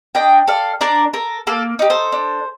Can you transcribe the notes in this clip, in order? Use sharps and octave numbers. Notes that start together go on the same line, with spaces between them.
D4 D#5 G5
A4 D5 F5
D4 A#4 D5
A4 A#4
A#3 A4
D#4 G4
A4 C5
D4